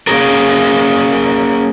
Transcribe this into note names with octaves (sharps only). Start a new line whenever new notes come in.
A#3 C#4 F#4 G#4 A#4